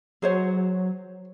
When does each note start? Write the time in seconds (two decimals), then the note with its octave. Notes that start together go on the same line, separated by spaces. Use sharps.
0.22 F#3 G#4 C5 C#5